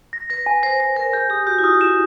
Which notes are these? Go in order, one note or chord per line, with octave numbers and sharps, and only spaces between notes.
A#6
B4 A#6
B4 G#5
C5 A#6
C5 G#5
A#4 A#6
G#4 G6
G4 D#6
F#4 G6
E4
F4 D#6
E4 E7